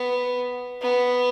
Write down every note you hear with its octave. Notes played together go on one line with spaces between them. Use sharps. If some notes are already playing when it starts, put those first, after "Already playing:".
Already playing: B3
B3